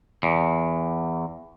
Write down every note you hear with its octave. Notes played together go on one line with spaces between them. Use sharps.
E2